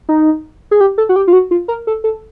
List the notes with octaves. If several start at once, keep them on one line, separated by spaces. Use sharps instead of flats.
D#4
G#4
G4
A4
F#4
G4
F4
F#4
F4
A#4
A4
A4